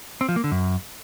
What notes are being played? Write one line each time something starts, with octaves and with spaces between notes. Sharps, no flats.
C4
F3
A#3
D3
F#2